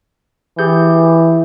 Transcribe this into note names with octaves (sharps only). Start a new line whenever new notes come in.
E3 G4 G#4 G6